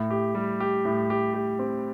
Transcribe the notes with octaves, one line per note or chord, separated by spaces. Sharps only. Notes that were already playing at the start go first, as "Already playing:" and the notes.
Already playing: A2
G4
G3
G4
A2
G4
G4
C4